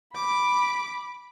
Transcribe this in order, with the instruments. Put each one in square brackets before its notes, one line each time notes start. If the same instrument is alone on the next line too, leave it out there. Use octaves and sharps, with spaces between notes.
[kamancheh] B5 [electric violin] D6